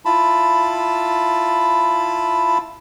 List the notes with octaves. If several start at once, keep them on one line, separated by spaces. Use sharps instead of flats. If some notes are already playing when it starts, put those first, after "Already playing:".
E4 F4 A5 B5